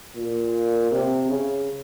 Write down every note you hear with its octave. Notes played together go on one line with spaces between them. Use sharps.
A#2
C3
C#3